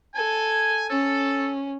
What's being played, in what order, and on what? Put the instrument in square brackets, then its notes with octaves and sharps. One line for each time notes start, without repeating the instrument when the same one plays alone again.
[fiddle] A4 [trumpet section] G#5
[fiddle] C#4 [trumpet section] A4